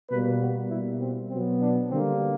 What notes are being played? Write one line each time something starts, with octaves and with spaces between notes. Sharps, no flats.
B2 G3 A#3 B4
F#4
B2 G3 A#3 E4
C4
B2 F#3 B3 C4
D4
D3 G3 A#3 C4